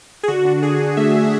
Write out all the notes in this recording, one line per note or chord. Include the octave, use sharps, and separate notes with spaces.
G#4
D3 F#4
D4
F#4
D4 G#4
D3
A3 E5
D4